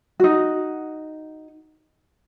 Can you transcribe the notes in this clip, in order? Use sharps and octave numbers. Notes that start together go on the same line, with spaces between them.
D#4 F#4